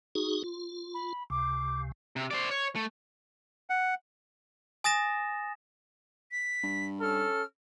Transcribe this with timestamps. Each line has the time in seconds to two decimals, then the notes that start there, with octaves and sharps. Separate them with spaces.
0.15 D#4 F#4 G#4
0.44 F4
0.94 B5
1.30 C#2 C3 D6
2.16 C3
2.31 C5 D5
2.51 C#5
2.75 A3
3.70 F#5
4.84 G#5 D#6 A6 A#6 E7
6.31 B6
6.63 G2
7.01 C#4 A4 F6